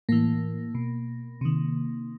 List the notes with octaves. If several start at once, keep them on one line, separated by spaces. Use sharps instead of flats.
A2 E3 A#3
B2
C3 D#3